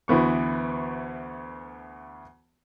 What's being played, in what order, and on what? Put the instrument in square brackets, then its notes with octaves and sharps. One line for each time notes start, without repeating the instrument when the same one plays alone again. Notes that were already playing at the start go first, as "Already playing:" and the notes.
[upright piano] D2 E3 B3 C#6